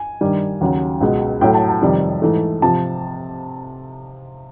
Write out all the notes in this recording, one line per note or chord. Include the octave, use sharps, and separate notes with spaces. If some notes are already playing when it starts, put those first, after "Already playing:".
Already playing: G#5
G2 D#3 G3
D#2 C#3 F#3
C#2 B2 G#3
A2 F#3 A3 G5
A5
A5
F2 C3 D#3 G3
G#2 E3 A3
C3 F3 A5